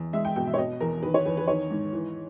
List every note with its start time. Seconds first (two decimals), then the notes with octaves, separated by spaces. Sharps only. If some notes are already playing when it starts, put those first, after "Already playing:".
Already playing: E2
0.13 G#3 E5
0.25 G5
0.36 B2 G5
0.47 E5
0.54 C#5
0.58 B2 D#5
0.80 E2 A#4
1.02 D#3 B4
1.14 C#5
1.25 E2 B4
1.37 B4
1.48 D#3 C#5
1.71 G#2
1.93 E3